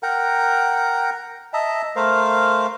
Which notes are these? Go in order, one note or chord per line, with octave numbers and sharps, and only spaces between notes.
A#4 F#5 G5 A#5
D#5 E5 A5 A#5
A3 A#4 C5 F5